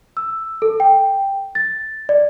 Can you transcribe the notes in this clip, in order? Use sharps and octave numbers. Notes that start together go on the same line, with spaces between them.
E6
A4
G5
A6
D5